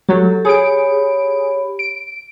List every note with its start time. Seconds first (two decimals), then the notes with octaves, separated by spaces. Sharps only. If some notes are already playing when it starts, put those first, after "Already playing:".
0.09 F#3 G4 A4
0.45 G4 G#4 C#5 B5 D7
1.79 D7